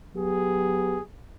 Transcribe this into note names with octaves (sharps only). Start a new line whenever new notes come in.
F#3 B3 G4 G#4